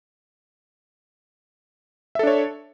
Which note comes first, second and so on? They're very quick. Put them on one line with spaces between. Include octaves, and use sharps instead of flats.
E5 A4 D4 C#5